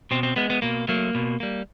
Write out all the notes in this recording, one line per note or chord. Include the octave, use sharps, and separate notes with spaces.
B2 C4
C4
G#3 B3
B3
B2 A#3
F#3 A3 A#3
B2
G3 A#3